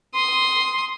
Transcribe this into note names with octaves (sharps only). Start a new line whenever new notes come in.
C6 D#6